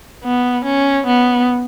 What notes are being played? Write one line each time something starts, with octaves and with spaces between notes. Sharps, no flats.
B3
C#4
B3